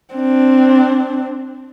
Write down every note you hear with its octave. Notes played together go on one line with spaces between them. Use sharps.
C4 D4